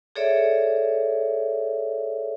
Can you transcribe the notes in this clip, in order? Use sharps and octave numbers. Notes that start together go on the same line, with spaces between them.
G#4 A4 C#5 D5 E5